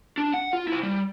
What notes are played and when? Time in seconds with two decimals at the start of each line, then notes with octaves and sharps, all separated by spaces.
0.18 D4
0.34 F#5
0.53 F4
0.68 E4 C5
0.83 G3